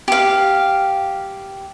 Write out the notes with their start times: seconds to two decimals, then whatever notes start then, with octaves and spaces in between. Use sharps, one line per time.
0.08 G4 F5